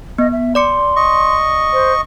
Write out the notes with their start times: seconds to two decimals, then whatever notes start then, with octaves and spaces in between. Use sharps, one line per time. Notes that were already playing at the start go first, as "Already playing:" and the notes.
0.18 B3 D#5
0.32 E5
0.55 D5 C6 D6 C#7
0.96 D#5 C#6
1.73 C5